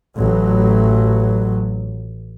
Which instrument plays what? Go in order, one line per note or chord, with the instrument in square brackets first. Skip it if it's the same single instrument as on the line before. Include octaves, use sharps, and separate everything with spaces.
[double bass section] A1 F#3